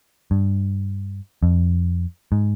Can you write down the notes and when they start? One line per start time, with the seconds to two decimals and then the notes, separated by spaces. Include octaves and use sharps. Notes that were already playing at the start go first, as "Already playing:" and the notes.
0.31 G2
1.43 F2
2.32 G#2